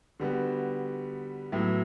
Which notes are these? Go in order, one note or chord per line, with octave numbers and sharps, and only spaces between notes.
D3 G3 B3 F#4
A2 F#3 B3 E4